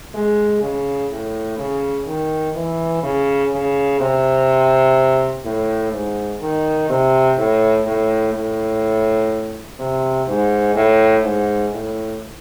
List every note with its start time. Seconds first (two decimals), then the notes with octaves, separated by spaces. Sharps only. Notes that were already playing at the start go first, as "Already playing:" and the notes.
0.15 G#3
0.62 C#3
1.11 A2
1.58 C#3
2.07 D#3
2.55 E3
3.03 C#3
3.52 C#3
4.00 C3
5.45 A2
5.93 G#2
6.41 D#3
6.89 C3
7.38 A2
7.86 A2
8.34 A2
9.79 C3
10.28 G#2
10.75 A2
11.24 G#2
11.72 A2